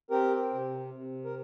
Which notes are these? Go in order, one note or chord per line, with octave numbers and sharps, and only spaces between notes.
C4 G4 A#4
C3
C3
A#4